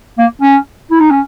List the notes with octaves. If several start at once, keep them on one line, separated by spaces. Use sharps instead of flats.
A#3
C#4
E4
D#4
C#4